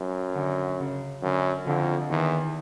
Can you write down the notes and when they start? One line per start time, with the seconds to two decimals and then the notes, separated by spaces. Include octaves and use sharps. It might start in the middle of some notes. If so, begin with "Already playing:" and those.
Already playing: F#2
0.35 D3
0.80 C#3
1.22 F#2 D3
1.66 F2 D3
2.10 E2 D#3